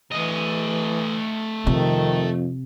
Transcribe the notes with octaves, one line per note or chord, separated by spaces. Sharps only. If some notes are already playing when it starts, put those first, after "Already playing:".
E3 A3 D#5
F2 C3 D#3